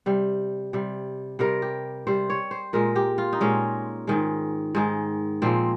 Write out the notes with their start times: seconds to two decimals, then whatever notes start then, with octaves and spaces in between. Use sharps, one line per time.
0.06 C3 G3
0.73 C3 G3
1.39 C3 G3 A#4
1.62 G4
2.07 C3 G3 C5
2.30 C#5
2.51 C5
2.73 A#2 G#3 A#4
2.96 G4
3.18 F4
3.33 D#4
3.41 A#2 G#3 C#4
4.07 G#2 D#3 G#3
4.75 G#2 D#3 G#3
5.42 A#2 F3 G#3 C4